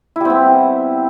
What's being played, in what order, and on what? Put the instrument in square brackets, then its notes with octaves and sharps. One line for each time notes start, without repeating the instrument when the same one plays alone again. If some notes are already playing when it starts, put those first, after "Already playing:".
[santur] E4
G3
C4
B3